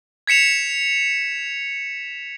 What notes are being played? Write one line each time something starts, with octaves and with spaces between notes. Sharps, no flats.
G#6 B6 C#7 E7 F7